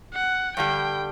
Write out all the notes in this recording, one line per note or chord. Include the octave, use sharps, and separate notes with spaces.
F#5
G2 D3 G3 G5